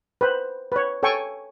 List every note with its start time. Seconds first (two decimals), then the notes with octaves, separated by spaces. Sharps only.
0.21 B4 C5
0.72 B4 C#5
1.03 A4 C#5 G5 G#5 C#6